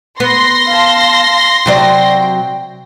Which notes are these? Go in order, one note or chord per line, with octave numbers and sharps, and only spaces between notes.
B3 C6 A#6
F5 A5
C3 F#3 D5 G5